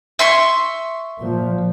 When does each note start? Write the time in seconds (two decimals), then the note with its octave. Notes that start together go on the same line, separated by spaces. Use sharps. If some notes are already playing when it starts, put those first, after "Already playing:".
0.19 E5 C6 C#6
1.20 A#2 F3